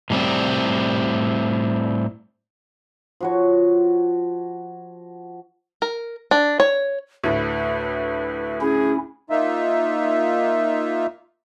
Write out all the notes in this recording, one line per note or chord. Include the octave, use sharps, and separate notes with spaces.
A2 G3 C4
F3 F#4 C#5
A#4
D4
C#5
D2 A2 B4
C#4 E4 G#4
A#3 D#4 F4 E5